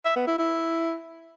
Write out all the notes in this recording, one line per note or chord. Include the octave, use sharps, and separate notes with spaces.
E5
B3
E4
E4